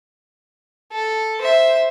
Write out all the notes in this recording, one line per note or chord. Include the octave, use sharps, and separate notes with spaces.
A4
C5 E5